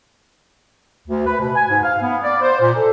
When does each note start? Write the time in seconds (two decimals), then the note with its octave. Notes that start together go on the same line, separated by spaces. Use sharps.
1.08 D2
1.26 B4
1.40 B2
1.55 G#5
1.69 G#2
1.83 F5
2.02 B3
2.23 D5
2.42 C5
2.60 A#2
2.76 A4